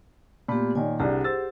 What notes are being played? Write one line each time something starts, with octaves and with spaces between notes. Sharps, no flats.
A#2 A3 B3 G4 B5
A#2 D#3 C#5 D5 G#5
C2 D4 G4 G#4 F#5
C5 E6 A6